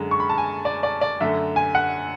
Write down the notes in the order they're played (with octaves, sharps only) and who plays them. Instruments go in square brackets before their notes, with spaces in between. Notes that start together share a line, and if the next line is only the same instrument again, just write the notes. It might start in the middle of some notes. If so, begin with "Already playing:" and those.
Already playing: [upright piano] F#2 D3 G#3
C#6
B5
A5
G#5
D5
D5
D5
F#2 D3 A3 E5
G#5
F#5